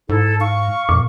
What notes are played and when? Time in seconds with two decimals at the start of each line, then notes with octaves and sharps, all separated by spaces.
0.09 G#2 D#4 E4 A4
0.40 F5 C#6
0.89 F2 A#2